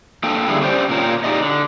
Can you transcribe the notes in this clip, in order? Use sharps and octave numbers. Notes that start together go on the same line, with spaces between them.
A#3 D4 A4 G5
D3 G3 E4 G#4
C#4 G4 C5 D5 G5
A#2 A#4 C#5
D#4 G4 G#4 D5 D#5
D3